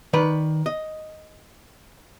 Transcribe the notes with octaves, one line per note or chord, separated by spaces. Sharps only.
D#3 B4 D5
D#5